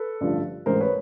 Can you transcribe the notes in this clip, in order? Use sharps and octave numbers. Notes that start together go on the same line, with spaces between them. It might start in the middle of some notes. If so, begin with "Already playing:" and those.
Already playing: A4 B4
A1 G2 D3 F3
A1 G#2 E3 A#4 C5
B4 C#5